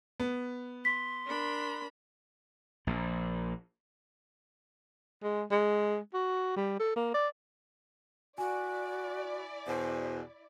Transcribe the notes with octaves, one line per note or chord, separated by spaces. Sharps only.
B3
C6 B6
D4 A#4 B5
A#1 A#2
G#3
G#3
F#4
G3
A4
A#3
D5
E4 F#4 D5 G#5
E2 B2 C5